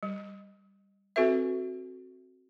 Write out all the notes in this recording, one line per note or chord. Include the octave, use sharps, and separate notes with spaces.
G3
C4 F#4 A4 B4 E5